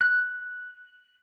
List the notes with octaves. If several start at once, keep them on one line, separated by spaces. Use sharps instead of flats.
F#6